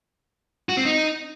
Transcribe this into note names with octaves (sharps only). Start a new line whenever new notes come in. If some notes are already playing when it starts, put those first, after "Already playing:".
F#4
C4
D#4